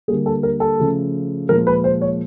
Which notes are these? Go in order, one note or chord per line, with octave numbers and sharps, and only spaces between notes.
D3 G3 A#3 G#4
A4
A#4
A4
C#3 F3 A3
A#2 F3 G#3 A#4
B4
C5
C#5